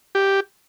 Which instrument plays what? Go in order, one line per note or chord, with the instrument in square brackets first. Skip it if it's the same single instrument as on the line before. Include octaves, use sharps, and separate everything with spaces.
[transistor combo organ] G4